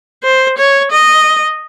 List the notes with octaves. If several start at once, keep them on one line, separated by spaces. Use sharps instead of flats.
C5
C#5
D#5